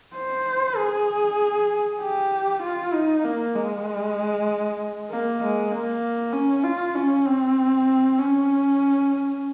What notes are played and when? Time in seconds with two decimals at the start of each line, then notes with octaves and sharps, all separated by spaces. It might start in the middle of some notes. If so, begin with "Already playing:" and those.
0.15 C5
0.77 G#4
2.01 G4
2.62 F4
2.94 D#4
3.25 A#3
3.56 G#3
5.10 A#3
5.41 G#3
5.72 A#3
6.33 C#4
6.64 F4
6.95 C#4
7.26 C4
8.19 C#4